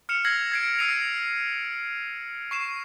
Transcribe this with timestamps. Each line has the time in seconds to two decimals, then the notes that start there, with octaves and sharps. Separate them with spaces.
0.09 F6 C#7 E7 F7
0.25 E6 F6 G#6 A#6 C7 F#7
0.52 G#6 C7 D7
0.79 E6 A#6 C7 D7 D#7 F7
2.51 C#6 C7 E7